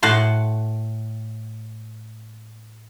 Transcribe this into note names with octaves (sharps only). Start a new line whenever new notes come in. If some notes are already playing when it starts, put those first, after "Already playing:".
A2 F#5 A5 C6